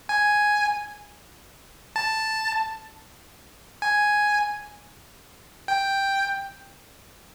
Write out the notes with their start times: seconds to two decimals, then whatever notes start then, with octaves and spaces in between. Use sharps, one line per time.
0.09 G#5
1.96 A5
3.82 G#5
5.68 G5